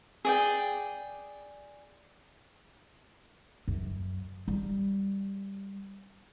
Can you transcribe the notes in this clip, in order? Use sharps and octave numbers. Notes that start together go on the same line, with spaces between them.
G#4 D5 G5
F#2
G3